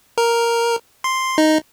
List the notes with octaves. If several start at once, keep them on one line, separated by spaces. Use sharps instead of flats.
A#4
C6
D#4